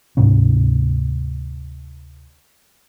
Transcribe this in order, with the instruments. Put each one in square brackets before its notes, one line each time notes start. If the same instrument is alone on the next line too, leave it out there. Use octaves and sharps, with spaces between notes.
[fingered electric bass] D2 G#2 C3 C#4